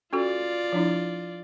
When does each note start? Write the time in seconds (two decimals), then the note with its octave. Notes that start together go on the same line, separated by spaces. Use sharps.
0.13 C#4 F4 F#4 A4 D5
0.73 F3 D4 E4